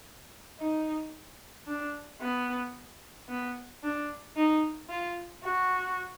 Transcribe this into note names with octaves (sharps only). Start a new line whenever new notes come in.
D#4
D4
B3
B3
D4
D#4
F4
F#4